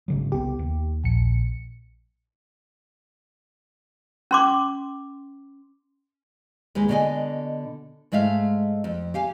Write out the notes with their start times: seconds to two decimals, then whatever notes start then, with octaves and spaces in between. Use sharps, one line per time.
0.08 G#1 C#3 F#3
0.32 C2 B3 G4
0.59 D#2
1.04 A#1 C#7
4.31 C#4 C6 D6
6.75 D#2 G#3 B4
6.88 B2 D3 D4 A4 D#5 G#5
8.12 G#2 G#3 A3 E5 F5
8.84 F2
9.14 G4 F5 G#5